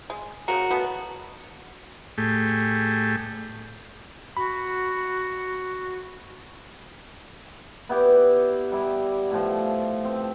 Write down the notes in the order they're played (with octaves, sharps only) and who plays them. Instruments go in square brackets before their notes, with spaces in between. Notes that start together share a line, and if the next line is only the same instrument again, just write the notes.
[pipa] G#3
[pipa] C#3 A#4 [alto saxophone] F#4
[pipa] B2 A3 B3
[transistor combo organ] A2 A3 G4 G#4
[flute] F#4 [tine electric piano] B5
[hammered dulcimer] B3 E4 G4 D5
G3 E4
A2 F3
C4